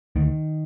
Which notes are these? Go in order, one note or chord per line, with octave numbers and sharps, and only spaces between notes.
D2 D#3